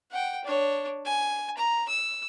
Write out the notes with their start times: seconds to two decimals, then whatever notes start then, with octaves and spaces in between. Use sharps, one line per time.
0.11 F#5 G5
0.44 D4 C#5
1.05 G#5
1.57 A#5
1.88 E6